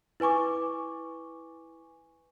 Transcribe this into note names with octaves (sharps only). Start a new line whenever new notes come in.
E4 B4 G#5 C#6 D6